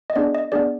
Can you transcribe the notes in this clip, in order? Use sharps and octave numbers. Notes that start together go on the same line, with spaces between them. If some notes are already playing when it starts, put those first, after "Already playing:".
D#5
B3 D4 G#4 D5
D#5
B3 D4 G#4 D5